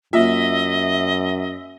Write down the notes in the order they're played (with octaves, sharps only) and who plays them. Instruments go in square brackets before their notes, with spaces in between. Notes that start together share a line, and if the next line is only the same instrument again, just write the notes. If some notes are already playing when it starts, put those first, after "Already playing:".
[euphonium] F#2 [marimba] A#3 F4 [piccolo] D#5 [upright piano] E5